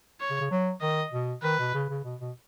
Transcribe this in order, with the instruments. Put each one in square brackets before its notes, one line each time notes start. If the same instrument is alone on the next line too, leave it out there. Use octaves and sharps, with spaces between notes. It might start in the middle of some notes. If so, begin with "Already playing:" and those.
[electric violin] C#5
[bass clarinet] C#3
C#3
F#3
[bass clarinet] D#3 [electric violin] D#5
[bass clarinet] B2
[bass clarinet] D#3 [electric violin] B4
[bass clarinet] B2
C#3
C#3
B2
B2